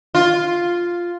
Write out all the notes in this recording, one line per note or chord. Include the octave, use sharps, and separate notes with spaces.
F4